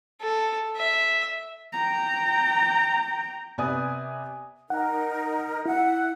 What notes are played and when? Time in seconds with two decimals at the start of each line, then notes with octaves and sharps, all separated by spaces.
0.21 A4
0.76 E5
1.73 G5 A#5
3.58 C3 B3 D5 G#5 D#6
4.70 D#4 A#4 F#5
5.66 E4 E5 F#5